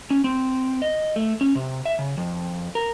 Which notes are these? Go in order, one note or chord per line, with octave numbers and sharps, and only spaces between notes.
C#4
C4
D#5
A3
C#4
C3
E5
C#3
F2
A#4